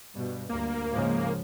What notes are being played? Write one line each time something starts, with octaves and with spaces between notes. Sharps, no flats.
G2 B2
D2 G2 A#3
G#2 C#3 F3